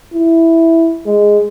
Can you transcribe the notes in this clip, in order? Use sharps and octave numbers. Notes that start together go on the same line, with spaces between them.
E4
G#3